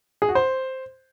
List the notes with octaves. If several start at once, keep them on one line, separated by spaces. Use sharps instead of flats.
G#4
F#4
C5